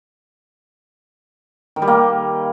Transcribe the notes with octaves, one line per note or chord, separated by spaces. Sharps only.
D#3
G3
A#3